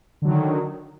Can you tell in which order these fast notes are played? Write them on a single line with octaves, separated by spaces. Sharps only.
D3 F#3 D#3